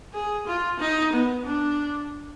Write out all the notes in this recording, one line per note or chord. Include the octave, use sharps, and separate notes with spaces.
G#4
F4
D#4
B3
D4